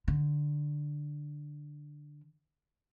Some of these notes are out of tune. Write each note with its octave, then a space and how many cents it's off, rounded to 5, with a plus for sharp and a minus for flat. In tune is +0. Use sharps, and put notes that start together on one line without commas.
D3 +5